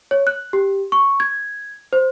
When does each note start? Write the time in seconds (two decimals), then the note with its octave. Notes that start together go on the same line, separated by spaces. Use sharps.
0.11 C#5
0.27 F#6
0.53 G4
0.92 C#6
1.20 G#6
1.93 C5